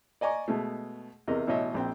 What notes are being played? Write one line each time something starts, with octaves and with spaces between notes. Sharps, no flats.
D5 D#5 G#5 A#5 C#6
B2 G#3 A3
E2 C3 A#4 D#5
A1 B2 C#5 D#5 E5
A#1 C4 G5